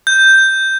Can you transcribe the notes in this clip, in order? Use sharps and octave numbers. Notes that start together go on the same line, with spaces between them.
G6